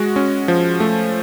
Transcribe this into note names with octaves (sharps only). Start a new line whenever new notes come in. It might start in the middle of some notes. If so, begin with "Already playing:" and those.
Already playing: G#3 F#4
C#4
F3
A3